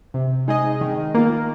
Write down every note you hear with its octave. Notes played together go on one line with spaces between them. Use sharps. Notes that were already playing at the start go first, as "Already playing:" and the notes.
C3
G#3 D#4 G#4 D#5
D#3
A#3 F4